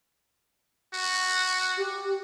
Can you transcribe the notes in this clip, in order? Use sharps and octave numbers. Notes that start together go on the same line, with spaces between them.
F#4
G4